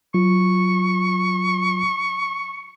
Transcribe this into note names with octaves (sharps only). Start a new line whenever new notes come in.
F#3 F4 C#6